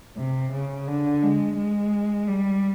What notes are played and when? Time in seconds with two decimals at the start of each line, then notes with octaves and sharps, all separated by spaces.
0.17 C3
0.52 C#3
0.87 D3
1.23 G#3
1.57 G#3
2.27 G3